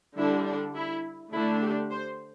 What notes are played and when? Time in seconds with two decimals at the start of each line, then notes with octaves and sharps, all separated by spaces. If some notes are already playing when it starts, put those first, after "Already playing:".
0.17 D3 G3 D4 E4
0.46 D4
0.75 E4
1.33 D3 A3 D4 E4
1.62 G4
1.91 C5